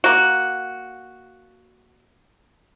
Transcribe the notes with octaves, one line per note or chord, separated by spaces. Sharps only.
A#3 F#4